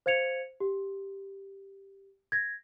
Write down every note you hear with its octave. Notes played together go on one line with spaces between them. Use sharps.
C5 F5 G#6 C#7 F7
G4
G#6 A#6